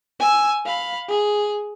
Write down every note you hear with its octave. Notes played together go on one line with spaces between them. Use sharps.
G#5 E6
F5 B5
G#4